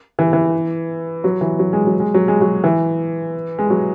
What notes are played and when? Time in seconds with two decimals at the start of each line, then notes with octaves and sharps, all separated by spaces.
0.19 E3
0.33 E3
1.24 F#3
1.41 E3
1.59 F#3
1.73 G#3
1.87 F#3
2.00 G#3
2.14 F#3
2.28 G#3
2.41 F#3
2.64 E3
3.59 G#3
3.70 F#3